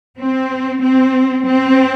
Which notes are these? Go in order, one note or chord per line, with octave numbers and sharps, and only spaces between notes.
C4
C4
C4